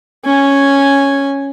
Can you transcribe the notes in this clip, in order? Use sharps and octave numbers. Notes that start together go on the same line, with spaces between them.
C#4 G#5